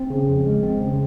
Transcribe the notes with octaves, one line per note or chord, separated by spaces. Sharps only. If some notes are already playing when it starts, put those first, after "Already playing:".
Already playing: C4
C#3
F2
G#3
C4
C#3